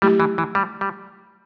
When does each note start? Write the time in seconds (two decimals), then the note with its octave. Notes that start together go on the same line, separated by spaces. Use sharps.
0.02 F#3 G3 A3 E4 G4
0.20 E3
0.38 E3
0.55 G3
0.81 G3